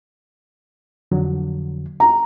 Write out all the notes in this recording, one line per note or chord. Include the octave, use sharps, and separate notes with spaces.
F2 D3 F#3
A#5